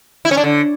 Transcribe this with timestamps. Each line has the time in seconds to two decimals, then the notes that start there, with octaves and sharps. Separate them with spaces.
0.25 E4
0.31 C#4
0.37 D4
0.44 D3